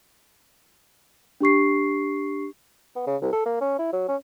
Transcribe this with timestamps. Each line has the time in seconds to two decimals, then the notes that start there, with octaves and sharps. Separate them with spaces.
1.41 D4 G4 C#6 C7
2.96 B3
3.07 C#3
3.21 C2
3.33 A4
3.45 A#3
3.61 C#4
3.79 E4
3.93 F#3
4.08 C#4